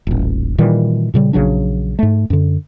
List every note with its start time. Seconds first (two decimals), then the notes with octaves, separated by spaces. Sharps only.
0.07 D#1 A1
0.58 A#2 D#3 E3 G3
1.14 A#2 C#3 G3
1.33 A#1 C#3 F#3 D4
1.99 G#2 A3
2.30 F#2 D3